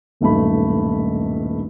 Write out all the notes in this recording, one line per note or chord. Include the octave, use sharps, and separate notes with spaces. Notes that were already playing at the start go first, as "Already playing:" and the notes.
D#1 B1 G2 A3 B5